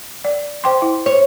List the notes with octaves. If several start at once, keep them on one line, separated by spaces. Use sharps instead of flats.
D5
C5 G5 C6
E4
C5 C#5